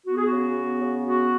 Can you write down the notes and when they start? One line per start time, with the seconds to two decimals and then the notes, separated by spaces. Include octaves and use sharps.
0.06 B3 F#4
0.16 G#4
0.26 F#4
0.31 C#3
0.56 B3
0.80 C#3
1.05 B3 F#4